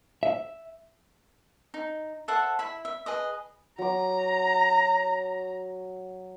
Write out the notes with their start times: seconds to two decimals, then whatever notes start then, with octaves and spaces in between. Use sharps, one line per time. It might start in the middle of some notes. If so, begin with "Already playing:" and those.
0.23 E5
1.74 D#4
2.28 A4 C5 E5 F#5
2.59 E4 E5 B5
2.85 E5
3.06 G#4 B4 D#5
3.79 F#3 A#5 D6